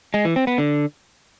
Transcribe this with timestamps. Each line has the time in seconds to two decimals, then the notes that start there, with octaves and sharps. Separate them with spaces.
0.14 G#3
0.25 E3
0.36 C4
0.47 B3
0.58 D3